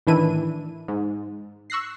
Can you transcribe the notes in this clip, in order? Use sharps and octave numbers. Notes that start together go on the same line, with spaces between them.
A2 D#3 E3 D4 E4 D#7
G#2
C#6 E6 F#6 A#6 C7